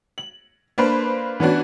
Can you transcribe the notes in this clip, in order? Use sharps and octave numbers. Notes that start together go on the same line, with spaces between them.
F#7
A#3 D4 B4 C5
E3 B3 C#4 D4 F#4